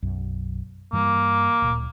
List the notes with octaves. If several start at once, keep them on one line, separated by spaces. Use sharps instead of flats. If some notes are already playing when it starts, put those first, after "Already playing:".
B1 F#2
G2 E3 G3 A#3
D1 A#2